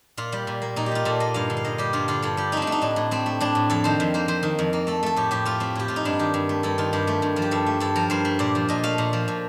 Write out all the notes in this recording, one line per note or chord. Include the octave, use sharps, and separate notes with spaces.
A#2 F4
G3
A#2
A#3
A#2 D#4
G4
G3 F4
A#2 A4
A#3 D#5
G2 F5
D3
F5
G2 D#5
G3 G4
G2 F4
D3 F4
G2 A4
G3 G4
A3 C4 D#4
D4
A3
D#4
A2 D4
A2
A3 C4
A3
A2 D4
A2
F2 A4
D#3 C5
F2
A#3 C5
F2 C5
D#3
F2
A#3
A3 A4
A3 A4
A2 G4
A2 G4
A3 F4
A3 C4
A2 G4
A2 F4
D#4
G2 D4
D#3 G4
G2
A3
G2 A4
D#3 F4
G2 G4
A3
G2
F3
G4
G2 A4
A3
G2 A4
F3 A#4
G2 C5
A3
A#2 D5
F3
A#2 D#5
A3 F5
A#2
F3
A#2